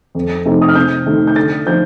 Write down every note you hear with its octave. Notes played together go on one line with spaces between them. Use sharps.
F2
C3 F3 A3 D#4
D#6
F6
C3 G6
D#3 A3 D#4
G6
D3 A6
F3 A3 D#4 G6